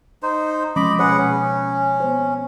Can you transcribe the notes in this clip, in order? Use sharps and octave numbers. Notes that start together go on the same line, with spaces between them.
D#4 C5
F3 G#3 C#4 D#5 B5 D6
B2 G#4 B4 C#5 F#5
C#4
B3 C5